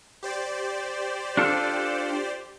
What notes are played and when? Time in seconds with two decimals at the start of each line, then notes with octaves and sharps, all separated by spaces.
0.23 G4 C5 D5
1.37 D4 F4 A4